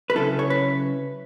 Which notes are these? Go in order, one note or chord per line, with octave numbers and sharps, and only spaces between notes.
B4
C#3 F#3 C#4 E4 A4
C#5
B4